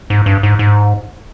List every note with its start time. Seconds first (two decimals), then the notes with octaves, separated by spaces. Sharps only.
0.10 G#2
0.26 G2
0.43 G#2
0.59 G#2